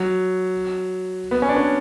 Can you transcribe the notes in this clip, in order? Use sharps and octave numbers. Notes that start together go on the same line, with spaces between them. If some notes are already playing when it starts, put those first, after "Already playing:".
Already playing: F#3
B3
C#4
D4
C#4